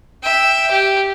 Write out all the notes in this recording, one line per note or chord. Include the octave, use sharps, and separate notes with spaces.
E5 G5
G4